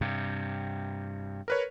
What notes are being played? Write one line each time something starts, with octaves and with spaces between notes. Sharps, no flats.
G2 C3
A#4 B4 C#5